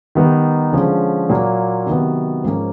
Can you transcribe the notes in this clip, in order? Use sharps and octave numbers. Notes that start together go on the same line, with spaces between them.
D#3 G3 B3 D#4
D3 F3 G#3 C#4
A#2 F#3 A#3
C3 D#3 F#3 B3
G#2 F3 A#3 C#4